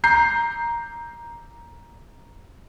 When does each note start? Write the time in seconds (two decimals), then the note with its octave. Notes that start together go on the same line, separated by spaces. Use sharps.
0.04 A#5 G6 C7